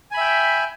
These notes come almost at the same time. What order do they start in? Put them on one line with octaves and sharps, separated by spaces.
G#5 B5 E5 G5